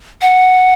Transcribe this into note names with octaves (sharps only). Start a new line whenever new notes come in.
F#5